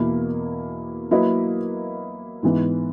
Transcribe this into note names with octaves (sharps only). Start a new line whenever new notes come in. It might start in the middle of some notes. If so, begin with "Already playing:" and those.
Already playing: E2 B2 A#3 E4
F#3 A#3 E4 B4 D#5
G#2 E3 B3